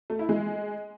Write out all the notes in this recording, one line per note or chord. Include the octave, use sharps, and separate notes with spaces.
A3
E4
G#3